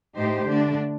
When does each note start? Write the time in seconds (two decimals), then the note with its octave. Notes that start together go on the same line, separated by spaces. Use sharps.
0.17 A2 A3 D#4 G4 C5
0.48 D3 A3 D4